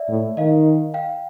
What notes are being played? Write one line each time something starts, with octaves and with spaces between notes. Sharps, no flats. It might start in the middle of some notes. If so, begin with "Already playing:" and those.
Already playing: D5 E5
A2
D#3 D#5 F5
F5 G5